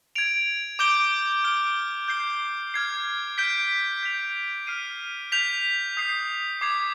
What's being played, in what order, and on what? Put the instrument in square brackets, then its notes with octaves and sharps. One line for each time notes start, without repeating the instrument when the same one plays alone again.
[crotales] G#6 D7 F7
D6 G6 D7 G7
F6 G#6 D7 G7
G6 C7 G7
F6 G#6 C7
G6 B6 D7 G7
G6 B6 F7
F6 C7 D#7
G6 B6 F7
D#6 G6 C7
D6 G#6 C7 F7